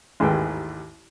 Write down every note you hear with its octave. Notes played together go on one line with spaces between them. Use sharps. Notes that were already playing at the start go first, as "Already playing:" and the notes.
A1 D#2 G#2 G#3 B4 G5